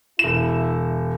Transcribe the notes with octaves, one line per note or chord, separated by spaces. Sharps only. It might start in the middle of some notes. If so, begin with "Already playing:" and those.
E1 E4 E7